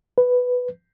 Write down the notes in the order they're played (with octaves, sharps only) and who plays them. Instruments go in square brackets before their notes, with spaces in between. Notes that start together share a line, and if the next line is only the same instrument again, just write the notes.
[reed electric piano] B4